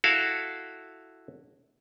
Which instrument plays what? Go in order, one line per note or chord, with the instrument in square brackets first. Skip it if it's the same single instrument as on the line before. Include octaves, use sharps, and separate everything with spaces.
[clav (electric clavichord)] E4 F#4 A4 F5